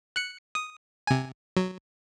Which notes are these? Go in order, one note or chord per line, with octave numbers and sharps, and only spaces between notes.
F#6 C#7
D#6
C3 G#5
F#3